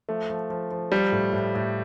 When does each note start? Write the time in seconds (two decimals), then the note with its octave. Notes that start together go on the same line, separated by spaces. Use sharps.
0.09 F3 A3
0.30 F3
0.50 F3
0.71 F3
0.92 F3 G3
1.12 A2
1.33 A2
1.55 A2